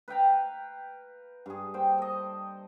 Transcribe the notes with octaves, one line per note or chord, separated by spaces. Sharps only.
B4 F5 G5 A#5
G2 G#4
A#3 C5 G5
A4 D#5